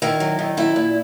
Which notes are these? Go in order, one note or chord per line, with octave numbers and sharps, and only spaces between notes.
D#3 E4
F#3
D#3
F#3 E4
A#2